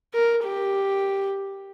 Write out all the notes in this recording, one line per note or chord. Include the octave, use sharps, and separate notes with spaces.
A#4
G4